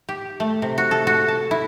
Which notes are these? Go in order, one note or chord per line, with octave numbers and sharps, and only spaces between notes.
G4
A3
C3
F#4
A4
F#4
A5
E4